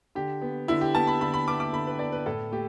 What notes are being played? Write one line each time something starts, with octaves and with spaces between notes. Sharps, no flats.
D3 G4
B3
D3 E4
G4
B3 A5
B5
D3 B5
B5
B3 D6
D6
D3 B5
B4
B3 D5
B4
A2 A4
A3 G4